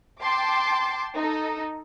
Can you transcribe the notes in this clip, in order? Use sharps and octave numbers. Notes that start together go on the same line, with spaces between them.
G5 A5 C6 D6
D#4 A4